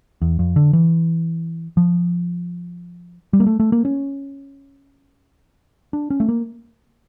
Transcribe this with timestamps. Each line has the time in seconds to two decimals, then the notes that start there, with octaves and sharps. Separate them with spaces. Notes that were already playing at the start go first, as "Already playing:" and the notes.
0.22 E2
0.39 F2
0.56 D3
0.73 E3
1.77 F3
3.33 G3
3.40 A#3
3.47 A3
3.60 A3
3.72 A#3
3.85 C#4
5.93 D4
6.10 C#4
6.20 A3
6.29 A#3